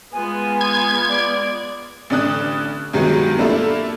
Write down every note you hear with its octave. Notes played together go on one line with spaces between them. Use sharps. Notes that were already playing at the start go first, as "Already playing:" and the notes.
G#3 B3 F4 G#5
G#6
D5
A1 D3 D4 D#6 F#6
G2 D#3 F#3 G#3 B3 D#4
A3 A#3 D4 E4 F4 A4